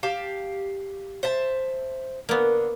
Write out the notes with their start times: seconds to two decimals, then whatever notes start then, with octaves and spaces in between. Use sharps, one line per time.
0.03 G4 F5 A5
1.23 C5 E5 A5
2.29 D3 A#3 B3